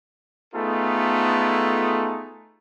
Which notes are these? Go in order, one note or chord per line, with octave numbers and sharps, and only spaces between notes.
A3 B3 D#4 F4 G#4 A4